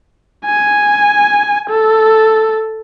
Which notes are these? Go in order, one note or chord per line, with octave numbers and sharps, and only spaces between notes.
G#5
A4